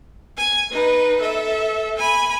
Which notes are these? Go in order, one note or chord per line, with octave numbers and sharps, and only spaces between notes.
G#5
D#4 B4
A4 E5
G#5 B5